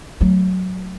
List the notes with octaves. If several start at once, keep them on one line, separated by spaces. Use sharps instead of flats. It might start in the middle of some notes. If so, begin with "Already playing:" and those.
F#3 A3